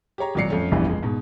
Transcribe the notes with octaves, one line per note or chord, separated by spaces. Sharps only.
G4 G#4 C#5 A#5
G#1 A#2 F#3 D5 C7 C#7
F2 F3 A3 C#4
F1 A#1 E2 G2 C#3 E3
F2 G#3
G#2 B2